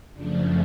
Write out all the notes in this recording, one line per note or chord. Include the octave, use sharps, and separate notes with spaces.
F#2 C#3 F3 A3 D4